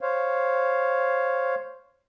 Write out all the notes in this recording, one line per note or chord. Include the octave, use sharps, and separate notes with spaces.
C5 C#5 F5